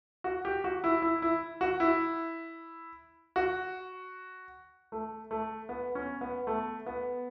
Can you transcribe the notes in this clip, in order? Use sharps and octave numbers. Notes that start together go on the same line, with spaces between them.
F#4
G4
F#4
E4
E4
E4
F#4
E4
F#4
A3
A3
B3
C#4
B3
A3
B3